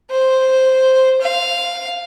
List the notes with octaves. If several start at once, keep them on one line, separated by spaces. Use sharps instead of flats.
C5
F5